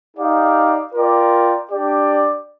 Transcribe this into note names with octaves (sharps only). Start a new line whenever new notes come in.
D#4 G4 D5 F5
F4 A#4 D5 G5
D4 G4 D5